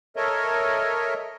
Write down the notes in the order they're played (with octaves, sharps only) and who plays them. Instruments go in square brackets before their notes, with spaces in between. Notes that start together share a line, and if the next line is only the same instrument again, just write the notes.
[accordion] A4 A#4 C#5 D#5 E5